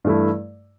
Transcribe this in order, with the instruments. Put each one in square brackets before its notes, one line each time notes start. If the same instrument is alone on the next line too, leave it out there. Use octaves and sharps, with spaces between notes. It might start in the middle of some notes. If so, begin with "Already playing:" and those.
[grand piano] G2 E3 A3 E4